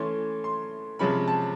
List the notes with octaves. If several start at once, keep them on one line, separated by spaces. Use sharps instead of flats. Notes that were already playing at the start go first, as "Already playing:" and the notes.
Already playing: E3 A3 C#4 C6
C6
C3 F3 G#3 C#4 B5
A5